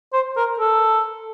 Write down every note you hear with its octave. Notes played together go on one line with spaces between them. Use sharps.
C5
A#4
A4